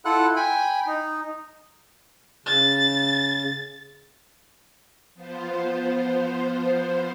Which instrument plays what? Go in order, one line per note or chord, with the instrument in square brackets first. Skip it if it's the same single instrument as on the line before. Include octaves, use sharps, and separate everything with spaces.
[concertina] E4 F4 A4 F#5 F#6
G5 G#5 B5
D#4
[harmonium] C#3 [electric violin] A6
[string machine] F3 B3 F4 C5